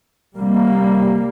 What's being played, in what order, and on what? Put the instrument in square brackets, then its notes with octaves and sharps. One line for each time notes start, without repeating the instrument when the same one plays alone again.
[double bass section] C2 C3 G3 A#3